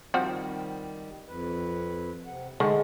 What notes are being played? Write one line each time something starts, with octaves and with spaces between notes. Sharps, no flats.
D#3 F3 G3 C4 F#4
F2 B4
C3 F#5
D3 D#3 G#3 A3